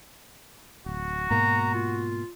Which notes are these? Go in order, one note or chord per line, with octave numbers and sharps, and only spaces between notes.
D1 F#4
G#2 B2 A#3 A#5
F4